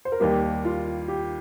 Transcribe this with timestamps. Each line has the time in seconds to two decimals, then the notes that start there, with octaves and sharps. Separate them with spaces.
0.05 C5
0.12 A#4
0.20 D#2 D#3 G3 A#3 G4
0.65 F4
1.08 G4